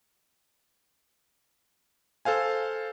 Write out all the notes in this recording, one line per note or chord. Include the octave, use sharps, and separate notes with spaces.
A4 C5 F5 G#5